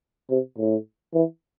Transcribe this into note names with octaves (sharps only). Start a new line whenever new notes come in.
C3
A2
E3